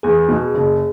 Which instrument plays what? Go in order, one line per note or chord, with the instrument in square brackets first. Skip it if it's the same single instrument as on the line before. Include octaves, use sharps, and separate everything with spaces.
[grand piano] E2 [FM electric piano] G#4
[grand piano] B2
F#1